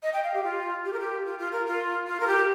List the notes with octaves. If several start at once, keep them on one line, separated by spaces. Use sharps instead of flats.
D#5
G5
F5
G4
F4
G4
A#4
G4
F4
F4
A#4
F4
F4
A#4
G4